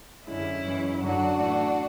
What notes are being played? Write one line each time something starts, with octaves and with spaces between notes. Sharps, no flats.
F#2 D3 G#3 C#4 E4
F#2 E3 G#3
F#2 D3 F#3 D4 F#4
A2 E3 A3